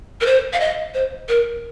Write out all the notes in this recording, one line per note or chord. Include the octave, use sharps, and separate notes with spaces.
A#4
C5
F5
D#5
C5
A#4